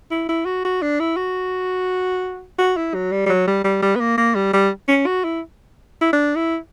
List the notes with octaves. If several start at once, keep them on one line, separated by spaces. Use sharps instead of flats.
E4
E4
F#4
F#4
D4
E4
F#4
F#4
E4
F#3
G3
G3
F#3
G3
G3
G3
B3
A#3
A#3
G3
G3
C#4
F#4
E4
E4
D4
E4